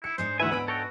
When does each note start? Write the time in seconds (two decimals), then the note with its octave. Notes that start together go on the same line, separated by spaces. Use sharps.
0.04 E4 C#7
0.18 G#2 G#3 D4 C5
0.40 D2 E3 B4 E5 F#5 G#5
0.52 B3 B5 E6 D7
0.68 F#4 A4 C#5 G5